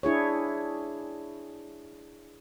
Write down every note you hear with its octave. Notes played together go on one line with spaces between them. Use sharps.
D4 E4 G#4 C#5